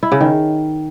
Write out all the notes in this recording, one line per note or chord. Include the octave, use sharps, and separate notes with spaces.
E4
C#3
D#3